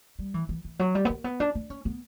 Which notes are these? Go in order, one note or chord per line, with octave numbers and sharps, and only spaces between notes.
G3
E3
E3
E3
F#3
G3
B3
A#3
B3
D4
D4
C#4
B3